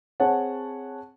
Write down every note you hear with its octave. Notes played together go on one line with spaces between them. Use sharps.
C4 G#4 C#5 F#5 A5